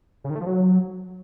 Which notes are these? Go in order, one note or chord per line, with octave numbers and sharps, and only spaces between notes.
C#3
D#3
A3
F3
F#3